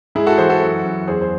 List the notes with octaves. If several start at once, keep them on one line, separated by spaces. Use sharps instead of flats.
G#2 E4 G#4
F#4 A4
E3 G#4 C5
F#4 A4
F#2
F#2
E2 G#4 C5
C5